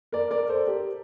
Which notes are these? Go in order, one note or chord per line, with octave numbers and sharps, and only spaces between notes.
A#4 D5
A#4 D5
A4 C5
G4 A#4